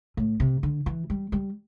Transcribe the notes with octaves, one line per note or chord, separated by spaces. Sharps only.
A2
C3
D3
E3
G3
G3